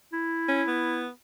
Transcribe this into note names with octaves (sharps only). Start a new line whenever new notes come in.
E4
C#4
B3